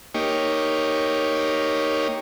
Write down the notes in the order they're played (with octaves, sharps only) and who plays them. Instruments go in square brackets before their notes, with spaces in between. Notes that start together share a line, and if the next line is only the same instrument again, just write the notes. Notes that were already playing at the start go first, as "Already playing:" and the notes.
[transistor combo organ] A#3 D#4 G4 C#5